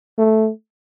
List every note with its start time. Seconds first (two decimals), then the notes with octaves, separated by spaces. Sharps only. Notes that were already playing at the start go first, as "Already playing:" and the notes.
0.18 A3